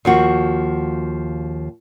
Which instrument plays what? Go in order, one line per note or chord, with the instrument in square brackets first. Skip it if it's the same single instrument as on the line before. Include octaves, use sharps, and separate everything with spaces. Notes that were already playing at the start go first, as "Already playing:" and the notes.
[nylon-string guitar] D#2 F3 F#4